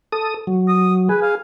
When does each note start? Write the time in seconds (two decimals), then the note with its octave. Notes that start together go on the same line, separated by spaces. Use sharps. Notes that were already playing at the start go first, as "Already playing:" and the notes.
0.12 A4 D#6
0.47 F#3
0.68 D#6
1.09 G#4 B4
1.22 F5